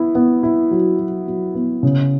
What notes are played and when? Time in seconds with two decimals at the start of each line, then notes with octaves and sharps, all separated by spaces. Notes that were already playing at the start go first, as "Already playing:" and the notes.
Already playing: B3 E4
0.15 B3
0.43 E4
0.71 F#3
1.00 F#3
1.27 F#3
1.55 B3
1.83 C#3